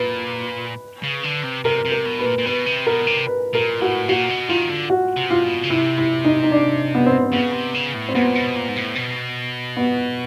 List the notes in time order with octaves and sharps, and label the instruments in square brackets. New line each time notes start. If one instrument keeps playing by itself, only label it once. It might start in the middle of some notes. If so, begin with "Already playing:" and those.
Already playing: [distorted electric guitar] A#2 [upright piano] B4
[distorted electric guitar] C#3
D3
C3
[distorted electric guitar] C3 [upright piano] A#4
[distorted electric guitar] C3
[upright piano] A#4
[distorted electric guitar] B2
[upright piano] B4
[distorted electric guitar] A#2
A#2
[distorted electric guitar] B2 [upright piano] B4
[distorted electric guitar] C3
[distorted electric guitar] B2 [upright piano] A#4
[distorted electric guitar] C3
[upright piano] B4
[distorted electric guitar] A#2 [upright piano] A#4
[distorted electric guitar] A2 [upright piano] F#4
[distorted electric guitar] A#2 [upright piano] F#4
[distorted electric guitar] B2
[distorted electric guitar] D#3 [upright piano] F4
[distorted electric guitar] D3
[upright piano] F#4
[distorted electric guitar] C3
[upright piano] F4
[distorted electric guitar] B2
C#3
[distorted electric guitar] C3 [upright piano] E4
[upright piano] E4
D#4
D#4
D4
B3
C4
C4
[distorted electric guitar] C#3 [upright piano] B3
[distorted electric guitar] C3
C#3
A2
[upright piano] C4
[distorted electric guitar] A#2 [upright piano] B3
[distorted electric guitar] B2
A#2
G#2
A2
B2
[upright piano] B3